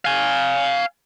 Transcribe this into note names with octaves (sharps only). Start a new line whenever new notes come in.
F5 G#5